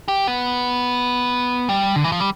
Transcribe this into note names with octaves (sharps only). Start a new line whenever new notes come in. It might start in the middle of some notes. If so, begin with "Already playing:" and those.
G4
B3
G3
D3
E3
F3
G3